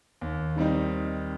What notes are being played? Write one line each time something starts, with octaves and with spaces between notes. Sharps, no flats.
D#2
D#3 G3 C4 D#4